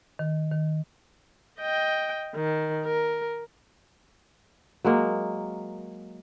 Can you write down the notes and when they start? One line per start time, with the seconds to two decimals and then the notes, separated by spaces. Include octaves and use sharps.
0.19 D#3
0.52 D#3
1.59 D#5 G5
2.35 D#3
2.85 A#4
4.85 F#3 G#3 A#3